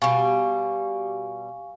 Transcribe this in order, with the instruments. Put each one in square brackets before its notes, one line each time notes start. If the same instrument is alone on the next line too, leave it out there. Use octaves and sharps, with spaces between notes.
[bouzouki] B2 G3 [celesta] F5 G#5 C#6